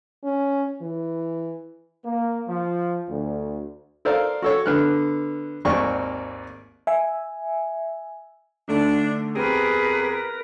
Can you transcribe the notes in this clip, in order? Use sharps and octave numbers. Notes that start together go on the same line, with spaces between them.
C#4
E3
A#3
F3
D2
A4 A#4 C5 D5 F5
F#4 A4 C#5
D3 B3 F6 F#6
G#1 D#2 A#3 C4 D5 C#6
E5 G#5
D3 A3 D4 D#4
F2 B3 C4 G4 G#4 A#4 B4